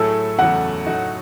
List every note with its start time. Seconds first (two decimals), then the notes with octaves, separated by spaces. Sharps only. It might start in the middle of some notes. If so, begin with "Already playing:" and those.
Already playing: A2 F#3 A3 E4 G#4 A4
0.39 E2 C#3 F#3 A3 F#5
0.86 A2 F#3 A3 D#4 F#4